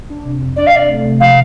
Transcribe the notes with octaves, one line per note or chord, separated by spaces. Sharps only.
D4
C3
F2
D4 D5
F5
C3 D5
A3
C3
F3 F5